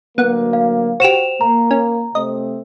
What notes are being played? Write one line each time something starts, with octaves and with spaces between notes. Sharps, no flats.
D2 F#3 A#3 B3 F#5
F5
F#4 G4 C5 E7 F7
A#3 A#5
C#4
C3 A3 C4 D#5